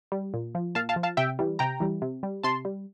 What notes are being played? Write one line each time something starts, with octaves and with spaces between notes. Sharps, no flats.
G3
A#2
F3
A#2 F5 A5
F5 A5
F3
F5 A5
C3 E5 G5
E3 G3
C3 G5 A#5
E3 G3
C3
G3
C3 A5 C6
G3